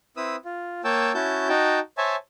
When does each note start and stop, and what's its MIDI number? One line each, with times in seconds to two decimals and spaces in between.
0.17 0.36 60
0.17 0.36 64
0.17 0.36 71
0.17 0.36 87
0.17 0.36 88
0.45 0.81 65
0.84 1.12 58
0.84 1.12 73
0.84 1.12 79
0.84 1.12 81
0.84 1.12 88
1.14 1.49 61
1.14 1.49 64
1.14 1.49 66
1.14 1.49 81
1.14 1.49 91
1.49 1.79 63
1.49 1.79 66
1.49 1.79 79
1.49 1.79 81
1.98 2.16 72
1.98 2.16 73
1.98 2.16 76
1.98 2.16 80
1.98 2.16 81